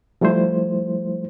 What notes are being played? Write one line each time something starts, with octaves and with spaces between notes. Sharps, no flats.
F3 G3 A3 E4 C5